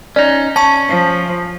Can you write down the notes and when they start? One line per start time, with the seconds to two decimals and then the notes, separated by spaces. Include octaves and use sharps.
0.16 C#4 D#4 D5
0.56 C#4 A5 C#6
0.88 F3